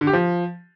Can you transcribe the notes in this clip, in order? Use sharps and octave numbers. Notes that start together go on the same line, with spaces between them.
D3
G4
F3